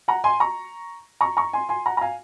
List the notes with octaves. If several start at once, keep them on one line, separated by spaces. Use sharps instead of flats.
F#5 A#5
G#5 C6
A#5 C#6
A#5 C#6
A#5 C#6
G#5 C6
G#5 C6
F#5 A#5
A#5
F5 G#5